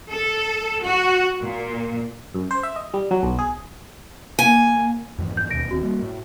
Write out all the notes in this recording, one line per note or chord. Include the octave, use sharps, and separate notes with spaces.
A4
F#4
A#2
F#2
C5
E5
D#5
G3
F#3
B1
G#4
A#3 G#5
F2 G#2 E3
G6
D#2 B2 A#6 D7
D1 D#3 C4 F#4
G3 A#3
A2